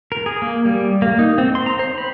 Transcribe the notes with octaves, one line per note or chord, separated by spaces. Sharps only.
A#4
G#4
A#3
G3
A#3
D#4
C4
C6
A#5
C5
B5